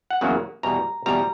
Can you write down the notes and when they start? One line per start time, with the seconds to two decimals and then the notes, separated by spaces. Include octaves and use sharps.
0.10 F#5
0.21 E2 C#3 F#3 A#3
0.63 E2 B2 G3 A#5
1.06 E2 B2 G3 A#5